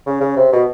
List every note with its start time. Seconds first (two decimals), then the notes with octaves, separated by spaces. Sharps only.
0.06 C#3
0.21 C#3
0.36 C3
0.53 B2